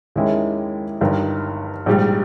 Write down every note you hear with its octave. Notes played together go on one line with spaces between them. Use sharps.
D#2 D#3 G#3 C#4 E4
G1 G2 D#3
A#1 G#2 G3